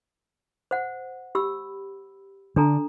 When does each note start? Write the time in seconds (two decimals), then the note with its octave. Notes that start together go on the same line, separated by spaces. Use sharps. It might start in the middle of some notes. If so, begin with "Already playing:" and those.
0.71 C5 F#5
1.35 G4 B5 E6
2.56 D3 D4 A4 A#5